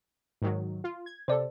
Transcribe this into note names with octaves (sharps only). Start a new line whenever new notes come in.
G#2 D#3 F#3
F4
G#6
C3 A4 C5 D5